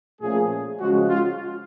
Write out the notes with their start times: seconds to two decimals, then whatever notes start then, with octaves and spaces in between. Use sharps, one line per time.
0.21 A#2 F3 A3 C#4 G#4
0.80 C#3 F3 G#3 C#4 F#4
1.09 F4